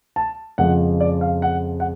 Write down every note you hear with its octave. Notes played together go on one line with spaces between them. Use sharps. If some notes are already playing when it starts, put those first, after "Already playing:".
A5
F2 C#3 F3 G#3 F#5
D5
F5
F#5
F#5